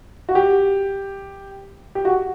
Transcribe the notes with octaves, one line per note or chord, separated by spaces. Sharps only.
F#4
G4
G4
F#4